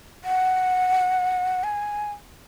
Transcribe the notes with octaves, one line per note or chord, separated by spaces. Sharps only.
F#5
G#5